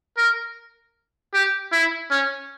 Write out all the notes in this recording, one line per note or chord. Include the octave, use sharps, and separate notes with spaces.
A#4
G4
E4
C#4